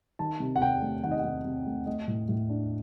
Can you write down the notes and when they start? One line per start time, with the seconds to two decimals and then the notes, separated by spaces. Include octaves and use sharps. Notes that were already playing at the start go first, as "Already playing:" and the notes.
0.19 D#3 A5
0.40 C3
0.56 F#5
0.61 C3 G5
0.82 A3
1.03 D#3 F#5
1.11 D#5
1.19 F#5
1.24 C3
1.45 C3
1.67 A3
1.87 A3 D#5
2.08 A2
2.29 A2
2.49 D4